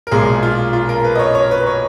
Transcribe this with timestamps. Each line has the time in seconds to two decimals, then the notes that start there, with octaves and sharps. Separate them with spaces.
0.07 A#4
0.11 B1 A#2 G#3 G#4
0.43 F4
0.73 F4
0.89 A#4
1.04 B4
1.15 D#5
1.19 C#5
1.35 C#5
1.51 B4
1.66 C#5